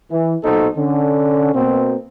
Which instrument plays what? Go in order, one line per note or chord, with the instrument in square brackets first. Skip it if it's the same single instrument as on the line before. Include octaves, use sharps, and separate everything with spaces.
[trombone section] E3
B1 A#2 D#4 F#4 A4 C5
D3 C#4
B2 A#3 C4